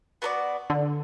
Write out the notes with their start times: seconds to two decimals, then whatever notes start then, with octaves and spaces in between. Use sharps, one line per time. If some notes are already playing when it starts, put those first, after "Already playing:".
0.22 B3 F#4 A4 D5
0.70 D3